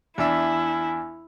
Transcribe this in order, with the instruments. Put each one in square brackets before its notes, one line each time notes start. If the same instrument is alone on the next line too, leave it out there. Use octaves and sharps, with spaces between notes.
[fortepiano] E2 D4 E5 [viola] E4 [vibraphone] G#5